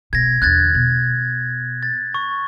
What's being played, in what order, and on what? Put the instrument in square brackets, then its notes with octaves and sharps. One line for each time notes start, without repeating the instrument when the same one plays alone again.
[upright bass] B2 [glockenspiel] G#6 A#6
[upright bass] E2 D3 [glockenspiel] F#6 G#6 A6
[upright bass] B2
[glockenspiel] A6
C#6